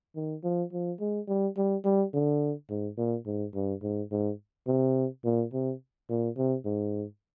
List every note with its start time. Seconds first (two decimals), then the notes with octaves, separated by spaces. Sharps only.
0.16 D#3
0.44 F3
0.73 F3
1.01 G#3
1.28 G3
1.57 G3
1.85 G3
2.14 D3
2.70 G#2
2.98 A#2
3.26 G#2
3.55 G2
3.83 G#2
4.12 G#2
4.67 C3
5.25 A#2
5.53 C3
6.10 A#2
6.37 C3
6.65 G#2